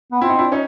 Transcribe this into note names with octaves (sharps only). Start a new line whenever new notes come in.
B3
C4 E4
D#4
D4 E4
C#4 D#4